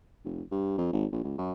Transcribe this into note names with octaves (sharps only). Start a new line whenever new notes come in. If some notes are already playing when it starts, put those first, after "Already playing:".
F1
G2
F2
G#1
A#1
C#2
F#2